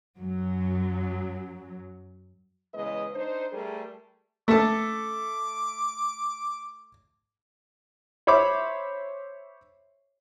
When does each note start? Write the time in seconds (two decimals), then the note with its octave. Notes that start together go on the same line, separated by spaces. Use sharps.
0.18 F#2 F#3
2.74 E2 C#3 G#3 B4 D#5
3.14 D4 D#4 C5
3.52 G3 A3 G#4 A#4
4.48 A3 A4 D6
8.27 C5 C#5 E5 B5 D6